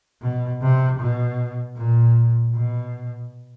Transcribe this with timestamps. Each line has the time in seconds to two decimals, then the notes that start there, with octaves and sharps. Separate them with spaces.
0.22 B2
0.62 C3
1.00 B2
1.76 A#2
2.54 B2